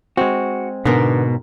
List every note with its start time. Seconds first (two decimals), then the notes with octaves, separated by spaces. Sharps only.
0.17 G#3 C4 F#4
0.85 G#2 B2 D3 B3 A#4